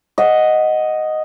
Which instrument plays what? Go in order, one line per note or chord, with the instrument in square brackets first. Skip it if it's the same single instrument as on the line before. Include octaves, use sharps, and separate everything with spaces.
[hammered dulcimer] D#5 F#5